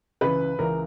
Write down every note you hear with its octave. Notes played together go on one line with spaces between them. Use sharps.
C#2 C#3 E3 B4
C#2 C#3 E3 A#4